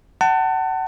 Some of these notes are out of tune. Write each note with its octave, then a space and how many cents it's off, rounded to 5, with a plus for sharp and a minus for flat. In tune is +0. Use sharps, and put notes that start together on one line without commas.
F#5 +30 A5 +25